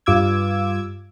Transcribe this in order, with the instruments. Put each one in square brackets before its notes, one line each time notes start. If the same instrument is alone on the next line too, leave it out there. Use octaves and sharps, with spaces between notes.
[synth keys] G2 F4 D6 E6 G#6